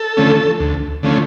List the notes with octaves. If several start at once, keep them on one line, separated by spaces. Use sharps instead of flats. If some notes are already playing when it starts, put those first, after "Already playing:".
Already playing: A4
D3 F3 A3 C#4
D2
D3 F3 A3 C#4